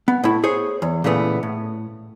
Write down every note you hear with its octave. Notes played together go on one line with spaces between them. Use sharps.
B3
A2 E4
G#4 C5 C#5
E2
A#2 C#3 E3 A3 B3
A2